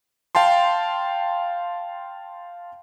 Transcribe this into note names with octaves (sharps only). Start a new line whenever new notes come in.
F5 G5 A5 C6